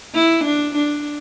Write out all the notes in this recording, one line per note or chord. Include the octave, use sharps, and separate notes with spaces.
E4
D4
D4